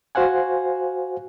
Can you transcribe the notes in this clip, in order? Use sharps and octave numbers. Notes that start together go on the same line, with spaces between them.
F#4 C5 F5 F#5 G#5